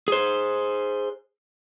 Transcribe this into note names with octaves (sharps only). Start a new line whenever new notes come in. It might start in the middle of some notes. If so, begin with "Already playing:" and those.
G#4 C5